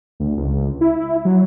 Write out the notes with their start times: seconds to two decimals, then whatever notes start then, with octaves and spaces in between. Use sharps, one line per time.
0.20 D2
0.37 C#2
0.81 E4
1.25 F#3